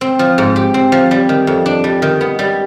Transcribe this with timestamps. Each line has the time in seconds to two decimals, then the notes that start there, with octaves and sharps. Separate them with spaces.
0.01 C4
0.19 F3
0.38 G#2
0.56 G4
0.74 C4
0.92 F3
1.11 G3
1.29 D#3
1.47 F2
1.66 D4
1.84 G3
2.02 D#3
2.21 B3
2.39 G3